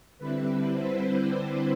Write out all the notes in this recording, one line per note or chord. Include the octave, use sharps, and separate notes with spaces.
D3 G3 C4 E4 B4
C5
C5